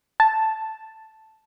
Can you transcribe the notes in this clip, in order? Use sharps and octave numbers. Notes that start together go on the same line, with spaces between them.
A5